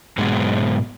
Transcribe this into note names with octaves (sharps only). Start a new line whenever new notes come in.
G#2 B2 F#3 G#3